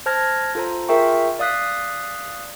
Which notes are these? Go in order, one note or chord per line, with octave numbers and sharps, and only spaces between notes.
C5 A5 F6 G#6 A#6
F4 A4 C5 A#5
F4 G#4 A#4 E5 G5 C#6
D5 F5 D#6 F#6 B6 C7